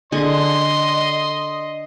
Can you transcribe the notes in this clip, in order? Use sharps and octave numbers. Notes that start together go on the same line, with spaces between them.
D3 G#4 D#5 G#5 C6